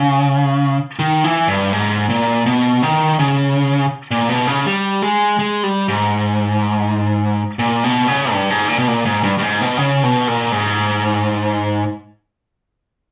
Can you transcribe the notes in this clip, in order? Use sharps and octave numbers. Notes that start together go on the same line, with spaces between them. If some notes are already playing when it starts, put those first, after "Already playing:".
Already playing: C#3
D#3
E3
G2
G#2
A#2
B2
D#3
C#3
A#2
B2
C#3
G3
G#3
G#3
G3
G#2
A#2
B2
C#3
G2
G#2
A#2
B2
A#2
G#2
G2
G2
G#2
B2
C#3
B2
A#2
G#2